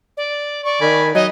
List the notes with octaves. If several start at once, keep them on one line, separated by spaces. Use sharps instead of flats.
D5
D5 C#6
D#3 G#5 B5
F#3 D#4 D#5